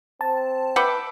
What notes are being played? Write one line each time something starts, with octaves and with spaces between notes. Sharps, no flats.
C4 A5
B4 E5 F#5 G5 D6